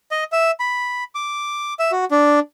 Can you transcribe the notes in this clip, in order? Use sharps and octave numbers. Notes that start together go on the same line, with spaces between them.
D#5
E5
B5
D6
E5
F#4
D4